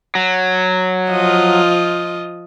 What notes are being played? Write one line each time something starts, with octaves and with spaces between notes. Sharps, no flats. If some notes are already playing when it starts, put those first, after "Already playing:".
F#3
F3 F4 D#5